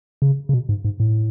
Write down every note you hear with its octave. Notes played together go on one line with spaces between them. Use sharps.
C#3
C#3
B2
G#2
G#2
A2